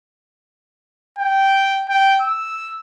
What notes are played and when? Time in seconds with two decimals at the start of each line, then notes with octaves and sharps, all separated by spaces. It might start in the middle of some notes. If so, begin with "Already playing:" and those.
1.19 G5
1.89 G5
2.21 E6